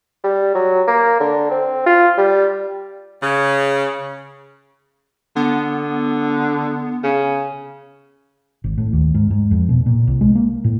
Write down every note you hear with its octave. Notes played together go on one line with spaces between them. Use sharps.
G3
F#3
A#3
D3
C4
F4
G3
C#3
D3 B3
C#3
G#1
A2
D#2
G#2
G#2
F2
B2
A#2
C2
G#3
A#3
A2